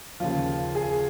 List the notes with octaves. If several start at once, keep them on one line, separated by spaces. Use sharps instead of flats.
D#2 C#3 F3 F4
G#4